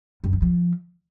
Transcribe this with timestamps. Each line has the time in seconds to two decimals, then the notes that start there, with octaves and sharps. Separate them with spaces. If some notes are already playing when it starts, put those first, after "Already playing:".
0.24 F#2
0.33 D#3
0.42 F3